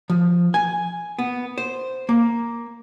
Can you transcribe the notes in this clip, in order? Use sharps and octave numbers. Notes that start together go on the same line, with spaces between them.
F3
G#5
B3
C5
A#3